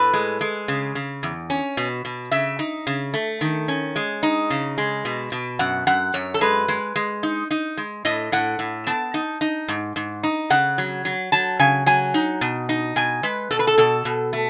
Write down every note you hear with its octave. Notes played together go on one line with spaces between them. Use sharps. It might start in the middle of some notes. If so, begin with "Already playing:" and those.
Already playing: A2 B4
G#3
G#3
C#3
C#3
E2
C#4
B2
B2
C#3 E5
D#4
C#3
A3
D#3
C#4
G#3
D#4
C#3
G#3
B2
B2
F#2 F#5
F#2 F#5
F#2 C#5
A4
G#3 B4
G#3
G#3
D#4
D#4
G#3
A2 D#5
A2 F#5
A2
B3 A5
D#4
D#4
G#2
G#2
D#4
C#3 F#5
F#3
F#3
F#3 A5
C#3 G#5
F#3 G#5
D#4
B2
D#4
B2 G#5
G#3 B4
B2 A4
B4
A4
B2 A4
B2
A3